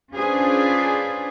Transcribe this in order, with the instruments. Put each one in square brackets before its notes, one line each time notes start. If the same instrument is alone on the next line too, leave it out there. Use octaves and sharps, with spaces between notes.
[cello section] C#4 D4 F4 G#4 B4 C5